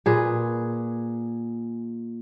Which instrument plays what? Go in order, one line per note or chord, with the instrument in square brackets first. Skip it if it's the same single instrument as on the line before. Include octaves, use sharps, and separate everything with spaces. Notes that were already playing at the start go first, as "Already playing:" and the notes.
[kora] A#2 G#4 B4